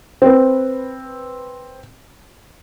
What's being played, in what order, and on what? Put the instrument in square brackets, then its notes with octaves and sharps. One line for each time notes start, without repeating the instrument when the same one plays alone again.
[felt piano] C4 B4